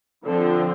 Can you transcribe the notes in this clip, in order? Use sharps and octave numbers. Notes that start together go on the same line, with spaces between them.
D3 F3 C4 A4